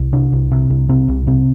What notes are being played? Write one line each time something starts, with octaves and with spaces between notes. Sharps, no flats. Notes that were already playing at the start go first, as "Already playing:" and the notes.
Already playing: C2
C3 D4
C2
C3
C2
C3 C4
C2
C3 C4